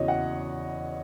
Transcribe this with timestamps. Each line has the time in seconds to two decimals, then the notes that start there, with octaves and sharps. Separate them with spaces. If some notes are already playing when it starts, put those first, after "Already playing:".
Already playing: E2 C#3 E3 F#4 C#5 D#5
0.08 F#5